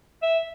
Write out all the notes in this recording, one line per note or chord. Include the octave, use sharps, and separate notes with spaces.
E5